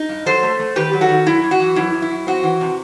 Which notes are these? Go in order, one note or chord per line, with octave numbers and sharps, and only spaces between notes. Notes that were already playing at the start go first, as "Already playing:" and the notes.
Already playing: D#4
G2
F#3 A4 C5
A3
A3
D#3 G4 B4
F#3
F#4 A4
D#3
F#2 E4
F#2
F#4
E3
F#2 E4
F#2
E4
F#2
C4 F#4
E3
C3